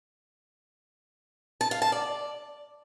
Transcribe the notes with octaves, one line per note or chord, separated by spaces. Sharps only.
A5
F5
A5
D5